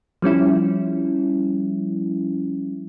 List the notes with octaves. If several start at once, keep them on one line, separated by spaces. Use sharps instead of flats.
F3 G3 C#4 E4